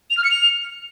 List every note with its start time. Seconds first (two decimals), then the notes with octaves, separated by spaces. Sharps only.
0.10 F7
0.17 F6
0.24 C#7
0.31 F7